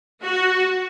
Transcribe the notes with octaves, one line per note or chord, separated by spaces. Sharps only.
F#4